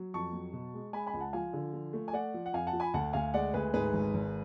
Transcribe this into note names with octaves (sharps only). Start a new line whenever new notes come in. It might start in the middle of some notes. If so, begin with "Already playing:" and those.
Already playing: F#3
F2 A5 C#6
F#3
B2
G#3
G#3 G#5 B5
G#5 B5
C#2
F#5 A5
F3 F5 G#5
D3
F3
A3
G#5
A3 D5 F#5
F3
F#5
F2 F5 G#5
F#5 A5
F3
G#5 B5
D2 F#5 A5
D2 F5 G#5
G#3 D5 F#5
D2 G#4 B4
G#2 G#4 B4
G#1
G#1